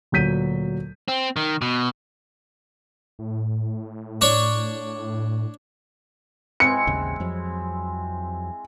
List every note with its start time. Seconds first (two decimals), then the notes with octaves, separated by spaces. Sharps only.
0.12 D2 A#2 F#3 G6 B6 D#7
1.08 C4
1.36 D#3
1.62 B2
3.19 A2
4.21 D4 C#5
6.60 G#3 C4 E4 C#7
6.87 A1 D#2 C#3 C4
7.20 F2 F3 F#3